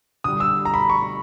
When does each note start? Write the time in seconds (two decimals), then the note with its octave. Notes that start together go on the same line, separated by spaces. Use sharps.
0.24 D3 G3 D#6
0.40 E6
0.65 A#5
0.74 B5
0.90 C#6